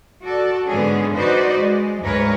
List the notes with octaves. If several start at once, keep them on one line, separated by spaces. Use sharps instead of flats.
F#4 A4 D5
G#2 D3 G#3 B3 C#4 G#4
D#4 F#4 B4 C5 D5 D#5
G#3
D2 G#2 G#3 A#4 B4 C#5